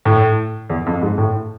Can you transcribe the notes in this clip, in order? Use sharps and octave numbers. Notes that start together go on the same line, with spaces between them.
A2
E2
F2
G#2
A2